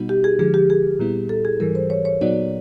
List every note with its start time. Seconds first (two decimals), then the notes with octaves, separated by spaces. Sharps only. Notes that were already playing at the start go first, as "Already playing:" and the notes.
Already playing: B2 G3 B3 D#4 F#4
0.09 G4
0.24 G#4
0.39 D3 F3 G#3 G#4
0.54 G4
0.70 G#4
0.99 A#2 G3 B3 E4
1.29 A4
1.45 G#4
1.60 G#2 E3 G3 A#4
1.75 C5
1.90 C#5
2.05 C#5
2.21 A#2 F#3 B3 D#4 F#4 D5